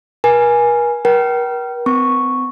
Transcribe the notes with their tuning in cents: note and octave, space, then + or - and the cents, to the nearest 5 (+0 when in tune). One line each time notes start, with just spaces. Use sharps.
A#4 +45 G#5 +0
A#4 +40 G5 -35
C4 -45 C#6 +0